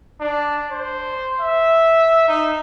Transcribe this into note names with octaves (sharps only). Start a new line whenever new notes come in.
D4
C5
E5
D#4